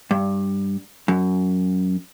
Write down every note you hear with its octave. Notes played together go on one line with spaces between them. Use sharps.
G2
F#2